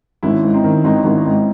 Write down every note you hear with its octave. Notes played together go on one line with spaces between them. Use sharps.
G#1 C#4 E4
G#2
C4 D#4
D#3
G#1 C4 D#4
G#1 C#4 E4
G#2 C4 D#4